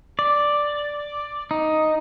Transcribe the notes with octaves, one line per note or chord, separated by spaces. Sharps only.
D5
D#4